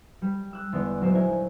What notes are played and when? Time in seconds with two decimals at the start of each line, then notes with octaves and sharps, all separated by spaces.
0.22 G3
0.53 E6 F#6
0.72 E2 D3 G#3 B3
1.01 A#1 F#3 G#3 C5 E7
1.14 E4 A#4 G#5